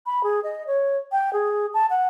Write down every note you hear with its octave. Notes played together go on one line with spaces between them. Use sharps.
B5
G#4
D#5
C#5
G5
G#4
A5
F#5